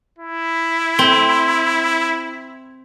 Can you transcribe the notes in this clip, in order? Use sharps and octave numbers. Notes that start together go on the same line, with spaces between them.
E4
C4